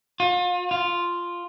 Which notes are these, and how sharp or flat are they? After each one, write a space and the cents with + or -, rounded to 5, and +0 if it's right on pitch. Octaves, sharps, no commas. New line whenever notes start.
F4 +35
F4 +0